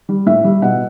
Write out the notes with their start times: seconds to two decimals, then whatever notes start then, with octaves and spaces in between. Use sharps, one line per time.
0.09 G3
0.26 A2 E5
0.44 G3
0.62 B2 F#5